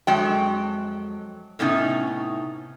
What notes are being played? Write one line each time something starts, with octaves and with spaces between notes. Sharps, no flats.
F2 F#3 G#3 G5
A2 C3 B3 C#4 D#4